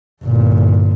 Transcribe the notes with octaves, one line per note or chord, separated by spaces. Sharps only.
G1 A#2